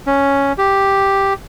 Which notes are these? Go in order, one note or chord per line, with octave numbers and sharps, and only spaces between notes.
C#4
G4